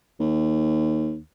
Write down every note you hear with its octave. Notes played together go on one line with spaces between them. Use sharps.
D#2